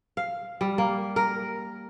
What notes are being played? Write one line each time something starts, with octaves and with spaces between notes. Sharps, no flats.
F5
G3
A#3
A#4